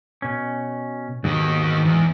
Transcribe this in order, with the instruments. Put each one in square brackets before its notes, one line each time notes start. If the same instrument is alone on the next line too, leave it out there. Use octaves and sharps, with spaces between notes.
[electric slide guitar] B2 C#4
[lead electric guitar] D#2 D#3 [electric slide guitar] G#2 B2
[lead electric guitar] E2